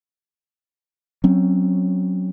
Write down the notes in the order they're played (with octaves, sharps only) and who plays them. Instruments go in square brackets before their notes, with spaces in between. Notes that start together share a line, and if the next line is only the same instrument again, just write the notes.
[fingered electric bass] F#3 C4 C#4